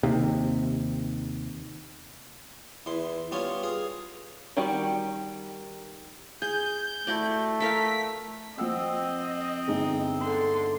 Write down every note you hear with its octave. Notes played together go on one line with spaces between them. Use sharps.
D#2 C3
E2 E3 C6
G3 B3 C#4 F4 C#5
G#4 F5
D#3 G3 F#4 G4 B5
G#4 G6
A3 E4 F#4 D5
A4 A#4 F5 B6
F3 C4 D#5 F#5 E6
G1 G#3 D#4
D3 C6